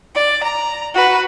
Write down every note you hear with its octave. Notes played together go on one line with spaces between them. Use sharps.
D5
A#5
F#4 B4